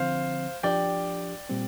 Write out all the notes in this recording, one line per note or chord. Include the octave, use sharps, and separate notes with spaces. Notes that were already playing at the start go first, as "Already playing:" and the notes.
Already playing: D3 F3 C4 C5 F5
F3 D4 G4 D5 G5
A#2 G3 C4